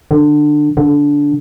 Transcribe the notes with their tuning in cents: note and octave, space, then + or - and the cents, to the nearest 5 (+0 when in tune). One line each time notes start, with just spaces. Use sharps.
D3 +20
D3 -15